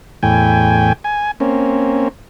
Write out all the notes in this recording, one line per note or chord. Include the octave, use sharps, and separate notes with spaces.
E2 A2 G5 G#5
G#5
A#3 C4 C#4